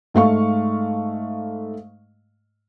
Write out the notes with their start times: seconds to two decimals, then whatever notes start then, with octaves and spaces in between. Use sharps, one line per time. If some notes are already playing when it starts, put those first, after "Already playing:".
0.14 G#2 A3 F5 C#6